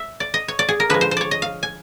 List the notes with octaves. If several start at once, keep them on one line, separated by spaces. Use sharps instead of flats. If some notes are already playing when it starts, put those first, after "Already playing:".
Already playing: E5
D5
D#5
C#5
D5
G#4
A#4
D3 F3 G#3 B4
C5
C5
C#5 D5
D#5
F5
G#5